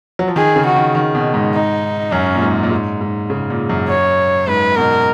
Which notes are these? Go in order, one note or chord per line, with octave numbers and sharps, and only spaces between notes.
F#3
F3
D#3 G#4
C#3
F#4
D#3
D#3
B2
G#2
D#4
F#2 C#4
A#2
G#2
A#2
G#2
G#2
C#3
A#2
F#2
C#5
G#2 B4
B2 A#4